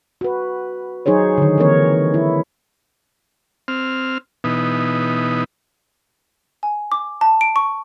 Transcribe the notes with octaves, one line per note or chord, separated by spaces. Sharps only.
F#4 B4
F#3 D#4 G#4 C5 C#5
D3 D#3
E3 A#3 C4 A#4 C#5
E4
C4 F6
B2 E3 B3 D#4
G#5
D6
A5
D7
C#6